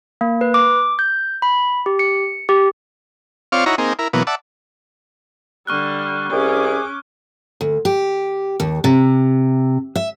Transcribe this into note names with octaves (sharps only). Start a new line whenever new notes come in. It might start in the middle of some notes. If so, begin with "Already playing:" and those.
A#3
B4
D6
G6
B5
G4
C#7
G4
C4 F4 C#5 D5 F5
D#4 E4 F#4 C#5 A#5
A#3 C4 D#4 G#4
E4 A#4
B2 E3 F#3 A#3 B3
D5 E5 F#5 A5
D3 G3 C#6 F6 F#6
C2 C#4 G#4 D6
D2
G4
D#2
C3
E5